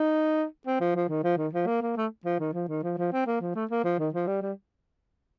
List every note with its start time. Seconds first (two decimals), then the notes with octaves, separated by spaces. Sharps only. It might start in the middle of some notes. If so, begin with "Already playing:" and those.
Already playing: D#4
0.66 C4
0.80 F3
0.95 F3
1.09 D#3
1.24 F3
1.37 D#3
1.53 F3
1.67 A#3
1.81 A#3
1.97 A3
2.25 F3
2.40 D#3
2.53 F3
2.68 D#3
2.83 F3
2.98 F3
3.13 C4
3.27 A#3
3.41 F3
3.55 A3
3.70 A#3
3.84 F3
3.99 D#3
4.14 F3
4.27 G3
4.42 G3